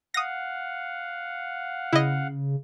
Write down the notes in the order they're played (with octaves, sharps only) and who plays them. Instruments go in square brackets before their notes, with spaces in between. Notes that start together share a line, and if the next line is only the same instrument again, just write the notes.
[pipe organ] F5 F#5 [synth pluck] D#6 A#6
[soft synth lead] C#3 [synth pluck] E4 D#5